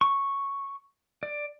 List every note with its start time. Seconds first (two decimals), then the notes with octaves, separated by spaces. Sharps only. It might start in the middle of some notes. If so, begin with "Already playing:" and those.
0.01 C#6
1.23 D5